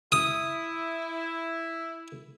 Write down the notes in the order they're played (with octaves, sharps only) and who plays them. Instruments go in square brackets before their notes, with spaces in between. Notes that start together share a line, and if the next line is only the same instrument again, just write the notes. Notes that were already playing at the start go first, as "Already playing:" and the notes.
[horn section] E4 [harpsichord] D#6